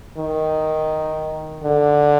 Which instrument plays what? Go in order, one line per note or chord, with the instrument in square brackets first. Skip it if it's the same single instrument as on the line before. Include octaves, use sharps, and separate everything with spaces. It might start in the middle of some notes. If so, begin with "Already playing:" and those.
[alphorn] D#3
D3